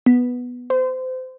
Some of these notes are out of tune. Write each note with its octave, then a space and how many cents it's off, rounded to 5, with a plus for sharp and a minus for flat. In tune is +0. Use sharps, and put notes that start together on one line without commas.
B3 -5
C5 -30